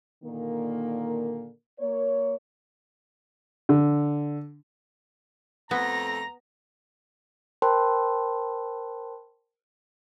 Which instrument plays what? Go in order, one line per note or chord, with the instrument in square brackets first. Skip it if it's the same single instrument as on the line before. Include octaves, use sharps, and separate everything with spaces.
[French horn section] A#2 D3 D#3 A#3
A#3 C#5
[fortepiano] D3
[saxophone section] F2 A3 [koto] B3 [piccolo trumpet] A#5 [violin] A#6
[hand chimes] A#4 C5 G5 A5 B5 C6